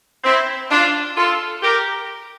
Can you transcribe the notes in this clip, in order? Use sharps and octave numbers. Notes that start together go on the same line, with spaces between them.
C4 E4
D4 F4
F4 A4
G4 A#4